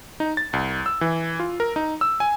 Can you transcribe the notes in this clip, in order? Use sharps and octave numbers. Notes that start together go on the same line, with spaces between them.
D#4
A6
C2
E6
E3
F4
A#4
D#4
E6
G#5